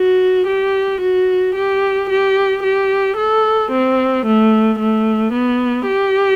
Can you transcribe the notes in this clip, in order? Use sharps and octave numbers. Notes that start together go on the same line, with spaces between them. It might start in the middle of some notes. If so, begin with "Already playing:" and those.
Already playing: F#4
G4
F#4
G4
G4
G4
A4
C4
A3
A3
B3
G4